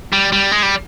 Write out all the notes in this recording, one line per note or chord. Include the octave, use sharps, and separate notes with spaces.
G3
G3
G#3
G3